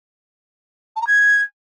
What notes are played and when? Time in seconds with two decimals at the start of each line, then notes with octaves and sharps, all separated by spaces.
0.96 A5
1.01 A#5
1.07 G#6